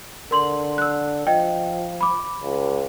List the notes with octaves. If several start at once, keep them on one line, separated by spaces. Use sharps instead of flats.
D3 A#4 C6 F#7
E6 F#6
F3 D#5 G5
B5 D6
C#2